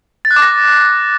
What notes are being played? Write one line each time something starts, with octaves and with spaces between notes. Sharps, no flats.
A6
F#6
D6
A#6